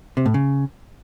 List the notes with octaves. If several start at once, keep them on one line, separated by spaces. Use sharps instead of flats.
C3
A2
C#3